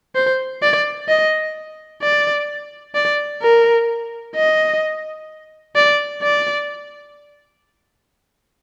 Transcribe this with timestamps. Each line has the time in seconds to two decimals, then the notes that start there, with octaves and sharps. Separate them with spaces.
0.15 C5
0.62 D5
1.08 D#5
2.02 D5
2.95 D5
3.42 A#4
4.36 D#5
5.76 D5
6.22 D5